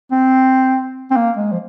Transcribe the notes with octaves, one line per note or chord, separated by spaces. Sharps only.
C4
C4
A#3
G#3
F3